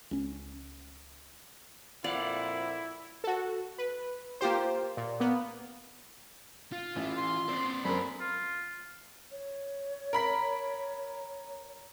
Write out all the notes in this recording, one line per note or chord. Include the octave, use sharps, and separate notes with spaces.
C#2 C#4
F2 A#2 E4 D5 F5 F#5
F#4 A4
B4
A#3 F4 G4 C5
A#2
A#3 B3
F4
A1 E3
C6
C4 B4 D5
F#2 A4 A#4 C5 B5
F4
C#5
A#4 B5 B6